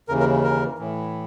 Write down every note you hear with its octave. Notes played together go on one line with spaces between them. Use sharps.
D#2 C#3 E3 A#4
A#4
A#4
A2 E3